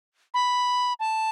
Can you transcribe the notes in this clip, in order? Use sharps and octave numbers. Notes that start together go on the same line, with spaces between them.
B5
A5